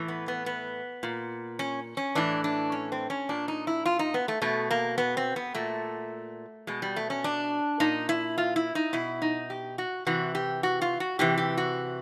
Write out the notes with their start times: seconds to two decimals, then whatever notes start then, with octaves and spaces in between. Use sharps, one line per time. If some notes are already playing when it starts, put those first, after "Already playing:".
Already playing: A2 E3
0.08 B3
0.28 B3
0.46 B3
1.03 A#2
1.59 C#4
1.97 C#4
2.15 A2 E3 D4
2.44 D4
2.72 C#4
2.92 C4
3.10 C#4
3.29 A#2 D4
3.48 D#4
3.67 E4
3.86 F4
3.99 D#4
4.14 B3
4.28 A3
4.42 B2 A3
4.71 A#3
4.98 B3
5.17 C4
5.36 B3
5.55 A#2 A3
6.67 B2 G#3
6.82 G3
6.96 A3
7.10 C#4
7.24 D4
7.80 A#2 D#4
8.09 E4
8.38 F4
8.56 E4
8.75 D#4
8.93 B2 E4
9.22 D#4
9.50 G4
9.78 F#4
10.07 C3 E3 F#4
10.35 G4
10.63 F#4
10.82 F4
11.00 F#4
11.19 C3 E3 G4
11.38 G4
11.58 F#4